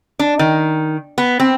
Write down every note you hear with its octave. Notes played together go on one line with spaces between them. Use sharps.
D4
D#3
B3
C4